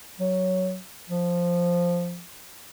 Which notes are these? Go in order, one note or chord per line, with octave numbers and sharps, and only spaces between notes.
F#3
F3